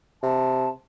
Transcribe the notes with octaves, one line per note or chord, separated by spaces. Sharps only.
C3 A5